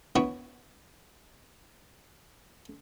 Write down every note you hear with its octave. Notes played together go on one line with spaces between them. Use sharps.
B3 E4 C#5